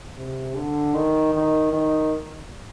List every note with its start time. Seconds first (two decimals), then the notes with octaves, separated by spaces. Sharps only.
0.16 C3
0.56 D3
0.95 D#3
1.34 D#3
1.73 D#3